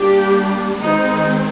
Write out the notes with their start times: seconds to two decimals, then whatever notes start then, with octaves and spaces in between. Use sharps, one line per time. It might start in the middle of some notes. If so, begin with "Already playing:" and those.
Already playing: G3 A#3 D4 G4
0.80 D#3 G#3 C4 D#4